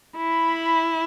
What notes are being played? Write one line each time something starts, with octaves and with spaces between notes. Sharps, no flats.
E4 B5